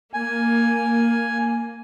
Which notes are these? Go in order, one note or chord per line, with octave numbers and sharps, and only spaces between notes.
A#3 G#5